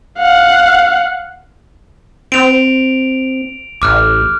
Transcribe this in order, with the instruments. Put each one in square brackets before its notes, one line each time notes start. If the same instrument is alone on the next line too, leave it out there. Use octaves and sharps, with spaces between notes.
[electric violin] F5 F#5
[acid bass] C4 [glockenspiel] D7 F7
[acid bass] A1 [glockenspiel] D6 F6 F#6